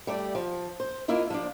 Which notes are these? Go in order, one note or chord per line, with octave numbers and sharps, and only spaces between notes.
G3 A3 D5
F3
C5
A#3 E4 F4 D#5
F3 D4